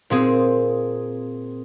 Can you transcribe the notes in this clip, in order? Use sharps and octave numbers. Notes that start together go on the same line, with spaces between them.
A#2 C4 G#4